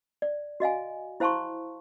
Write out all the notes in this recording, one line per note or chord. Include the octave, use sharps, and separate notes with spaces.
D5
F#4 D#5 F5 G#5
E4 C5 F5 A5 C6 C#6